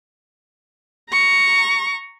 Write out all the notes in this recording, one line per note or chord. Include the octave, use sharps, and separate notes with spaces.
A#5 C#6